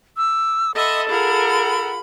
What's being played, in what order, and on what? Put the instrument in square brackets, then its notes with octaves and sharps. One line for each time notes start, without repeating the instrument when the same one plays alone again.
[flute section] D6 [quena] E6
[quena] A4 [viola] D#5 E5 [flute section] F#5 B5 C6
[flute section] F4 F#5 B5 [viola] G#4 A#4